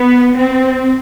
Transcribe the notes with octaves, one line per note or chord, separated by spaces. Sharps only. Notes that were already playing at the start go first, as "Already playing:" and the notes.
Already playing: B3
C4